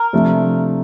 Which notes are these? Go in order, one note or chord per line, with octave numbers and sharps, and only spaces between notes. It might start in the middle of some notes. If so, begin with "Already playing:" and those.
Already playing: A#4
C3 F3 A3 D4